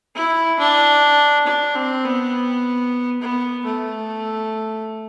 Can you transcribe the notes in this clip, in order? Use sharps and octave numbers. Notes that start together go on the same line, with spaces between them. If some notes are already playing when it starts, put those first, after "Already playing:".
E4
D4
D4
C4
B3
B3
A3